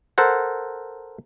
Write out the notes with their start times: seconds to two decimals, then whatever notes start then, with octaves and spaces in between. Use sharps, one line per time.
0.18 A4 A#4 C5 F#5